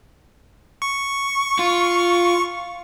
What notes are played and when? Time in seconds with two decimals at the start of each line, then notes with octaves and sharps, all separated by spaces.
0.82 C#6
1.59 F4